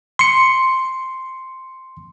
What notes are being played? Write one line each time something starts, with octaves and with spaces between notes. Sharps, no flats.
C6 C#7